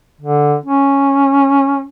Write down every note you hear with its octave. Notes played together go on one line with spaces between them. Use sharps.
D3
C#4